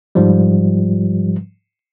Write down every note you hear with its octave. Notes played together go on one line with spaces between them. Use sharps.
G#2 F3 G3